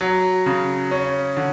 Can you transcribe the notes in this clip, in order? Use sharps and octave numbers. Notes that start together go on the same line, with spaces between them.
F#3
C#3
C#4
D3